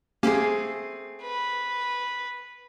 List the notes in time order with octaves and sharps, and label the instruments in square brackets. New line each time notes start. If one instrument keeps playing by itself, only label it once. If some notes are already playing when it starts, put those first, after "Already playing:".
[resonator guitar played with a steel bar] A3 C4 G#4 [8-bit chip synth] A#3 C#4 G4
[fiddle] B4